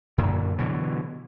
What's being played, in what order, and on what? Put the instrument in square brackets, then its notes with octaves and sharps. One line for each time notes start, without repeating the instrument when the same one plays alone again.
[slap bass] F#2 A#2 D3
B2 D3 E3 F#3